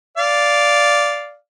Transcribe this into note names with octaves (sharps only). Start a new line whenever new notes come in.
D5 F5